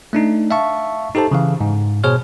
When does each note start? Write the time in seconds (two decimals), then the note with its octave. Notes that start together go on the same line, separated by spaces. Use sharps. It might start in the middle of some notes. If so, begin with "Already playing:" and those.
0.13 A3 D4 D#4
0.51 E5 F5 A5 C#6
1.15 D#4 G4 A4 C5 A5
1.31 C#3 E3 F5
1.61 G#2
2.04 B2 G#4 C5 C#5 F6